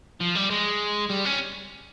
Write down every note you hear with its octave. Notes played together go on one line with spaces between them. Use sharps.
F3
G3
G#3
G3
C#4